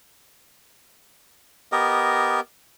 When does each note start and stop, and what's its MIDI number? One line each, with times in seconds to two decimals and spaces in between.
1.72 2.40 59
1.72 2.40 67
1.72 2.40 70
1.72 2.40 75